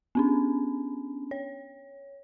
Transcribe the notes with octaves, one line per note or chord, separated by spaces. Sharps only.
B3 C#4 D4
C#5